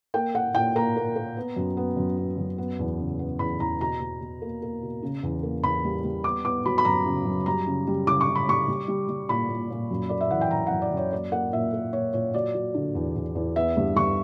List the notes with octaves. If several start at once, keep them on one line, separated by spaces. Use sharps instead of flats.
A#3 G5
A#3 F#5
A#2 G5
A#3 A#5
A#3
A#3
B3
F#2
B3
F#2
B3
F#2
B3
E2
C#3
B3
E2 B5
E2 A#5
B2 A#5
B2
B2
A#3
A#3
B2
C#3
E2
A#3
E2 B5
G3
G3
B3 D6
B3 D6
F#3 B5
B5
F#2 A#5
C#3
F#2
G3 A#5
C#3
G3
C#3 D6
C#6
C#3
B5
G3 C#6
G3
G3
G3
A#2 B5
A#2
A#2
F#2
A#3 D5
E5
E3 F#5
G5
F#2 A#5
F#2 F#5
D5
F#2
C#5
A#3 D5
A#3 F#5
A#2 E5
A#3
A#2 C#5
A#2 C#5
F#3 D5
F#3
D3
E2
E2
E2
B3 E5
G2
G2 C#6